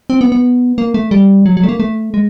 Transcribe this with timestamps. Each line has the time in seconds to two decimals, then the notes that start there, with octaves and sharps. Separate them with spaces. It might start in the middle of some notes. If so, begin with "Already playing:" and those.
0.10 C4
0.21 B3
0.32 B3
0.78 A#3
0.94 A3
1.11 G3
1.46 F#3
1.57 F#3
1.63 A3
1.69 A#3
1.80 A3
2.14 G#3